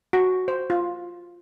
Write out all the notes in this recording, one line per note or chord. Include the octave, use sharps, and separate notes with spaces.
F#4
C5
F4